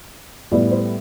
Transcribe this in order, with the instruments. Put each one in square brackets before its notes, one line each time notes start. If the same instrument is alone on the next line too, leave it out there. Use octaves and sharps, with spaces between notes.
[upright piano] A2 G3 B3 D5
C5